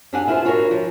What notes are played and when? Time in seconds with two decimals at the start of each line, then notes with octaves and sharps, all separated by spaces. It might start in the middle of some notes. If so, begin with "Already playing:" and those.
0.13 F#2 D4 G4 F5 F#5 G#5
0.28 E4 F4 G#4 B4 C5
0.45 D4 F4 F#4 A4 A#4 C#5
0.71 F3